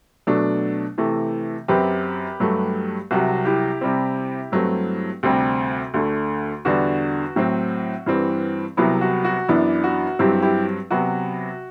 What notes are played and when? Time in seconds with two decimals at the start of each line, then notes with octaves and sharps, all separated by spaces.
0.27 B2 F#3 A3 D4
0.98 C3 E3 A3
1.68 F#2 F#3 C4 G4 B4
2.40 G2 F#3 A3
3.11 C2 C3 F#3 F#4
3.45 E4 G4
3.81 C3 G3 C4
4.52 G2 F#3 A3 C4
5.23 D2 C3 G3 C4
5.94 D2 D3 A3
6.65 E2 D3 G3 D4 F#4
7.36 A2 F#3 C4
8.06 G2 E3 G3 C4
8.77 C2 C3 F#3 B3 E4
9.01 F#4
9.25 F#4
9.48 F#2 E3 B3 D4 E4
9.84 F#4
10.19 G2 F#3 C4 E4 G4
10.42 E4 G4
10.91 C3 F#3 B3 F#4